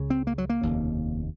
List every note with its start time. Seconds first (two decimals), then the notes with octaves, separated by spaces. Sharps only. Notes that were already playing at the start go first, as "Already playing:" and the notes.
Already playing: C#2 C#3
0.10 C4
0.27 A#3
0.38 F#3
0.50 A#3
0.61 F1 D#2 C#3